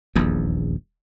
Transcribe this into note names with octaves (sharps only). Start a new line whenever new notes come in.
D#1 A#1 E2